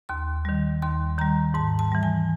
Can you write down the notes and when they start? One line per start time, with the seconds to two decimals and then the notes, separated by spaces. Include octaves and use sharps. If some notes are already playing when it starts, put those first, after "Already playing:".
0.09 D#2 C6
0.45 D#3 G3
0.82 D#2 C6
1.18 D#3 G3 A#5
1.54 G#2 A5
1.79 A5
1.92 E3 G3
2.03 G#5